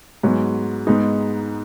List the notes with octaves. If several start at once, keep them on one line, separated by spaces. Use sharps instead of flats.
G#2 F#3 B3
G#2 G#3 B3 D#4